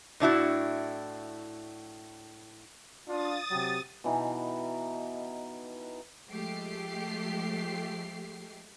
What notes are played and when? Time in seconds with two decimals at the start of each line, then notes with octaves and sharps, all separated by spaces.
0.20 A2 D4 E4 F#4
3.08 D4 F4 D#6 A6
3.51 C3 F#3 G4
4.04 B2 E3 D#4 G4
6.28 F3 G#3 A3 G4 C7